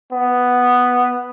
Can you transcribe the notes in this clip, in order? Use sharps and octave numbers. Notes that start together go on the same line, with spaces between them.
B3